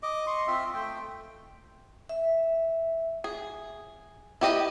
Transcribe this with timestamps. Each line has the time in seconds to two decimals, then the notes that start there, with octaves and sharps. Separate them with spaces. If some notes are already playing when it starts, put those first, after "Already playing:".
0.03 D#5 D6
0.27 D#5 C6 C#6
0.47 C4 F4 E5
0.74 A3 G5
2.09 E5
3.24 G#4
4.41 E4 G4 D#5